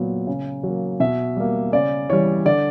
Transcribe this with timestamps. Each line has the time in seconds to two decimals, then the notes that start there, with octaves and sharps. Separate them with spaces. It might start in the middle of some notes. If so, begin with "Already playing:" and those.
Already playing: A#2 F#3 B3
0.27 C#3
0.63 F#3
0.69 A#3
1.00 B2 E5
1.37 G3 A#3
1.72 C#3 D5
2.10 E3 G3 C#5
2.45 D3 D5